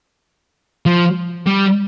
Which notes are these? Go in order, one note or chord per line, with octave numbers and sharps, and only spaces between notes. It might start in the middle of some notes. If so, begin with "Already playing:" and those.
F3
G3